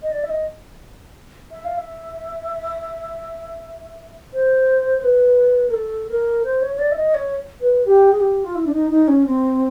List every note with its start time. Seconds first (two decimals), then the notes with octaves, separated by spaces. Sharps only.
0.02 D#5
0.12 D5
0.24 E5
0.29 D#5
1.52 E5
1.65 F5
1.78 E5
4.33 C5
4.99 C5
5.03 B4
5.68 A#4
5.74 A4
6.09 A#4
6.44 C5
6.62 C#5
6.75 C#5
6.79 D5
6.92 E5
6.96 D#5
7.14 C#5
7.61 B4
7.85 G4
8.12 G#4
8.20 G4
8.44 F4
8.55 E4
8.65 D4
8.73 D#4
8.90 D#4
9.08 C#4
9.26 C4